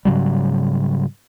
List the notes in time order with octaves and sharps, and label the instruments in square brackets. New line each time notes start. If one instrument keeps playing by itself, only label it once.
[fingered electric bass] G#2 C#3 F#3 G3